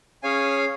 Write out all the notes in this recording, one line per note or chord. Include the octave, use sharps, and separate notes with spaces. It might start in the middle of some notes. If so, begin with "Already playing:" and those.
C#4 G#4 C#5 F5 G#5